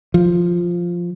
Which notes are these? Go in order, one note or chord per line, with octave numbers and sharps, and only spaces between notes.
F3